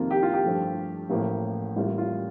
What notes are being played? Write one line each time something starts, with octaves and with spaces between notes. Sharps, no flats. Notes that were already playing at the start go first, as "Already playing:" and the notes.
Already playing: F2 C3 D#3 A#3 F4
G4
F4
G4
G2 F3 A3
A1 A2 F3 A#3
A1 A2 G3 A#3 F4
F4